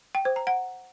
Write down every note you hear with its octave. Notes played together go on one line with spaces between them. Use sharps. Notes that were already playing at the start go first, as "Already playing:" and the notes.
G5
C5
A#5
F#5